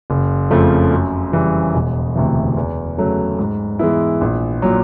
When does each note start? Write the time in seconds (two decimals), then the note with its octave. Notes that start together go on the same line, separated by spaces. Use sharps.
0.10 F#1
0.50 F2 C#3 F3 A3
0.92 F#2
1.32 C#3 E3 G3
1.74 E1
2.15 D2 C3 E3
2.57 E2
2.98 C#3 F#3 A3
3.39 G#2
3.79 E3 G#3 B3 E4
4.21 A#1
4.62 A#2 F#3